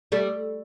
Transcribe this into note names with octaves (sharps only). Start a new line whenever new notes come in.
G3 A3